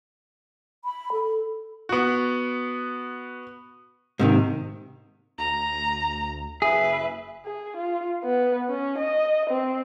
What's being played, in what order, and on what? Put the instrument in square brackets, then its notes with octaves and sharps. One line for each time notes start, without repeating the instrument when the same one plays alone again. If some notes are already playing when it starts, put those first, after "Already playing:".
[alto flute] B5
A4
[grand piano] B3 F#4
[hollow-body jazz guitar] G#2 C3 D#3
[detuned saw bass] D2 [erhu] A#5
[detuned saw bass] F#1 [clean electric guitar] G#4 [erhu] B4 [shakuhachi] E5
[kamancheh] G#4
F4
B3
C#4
D#5
C4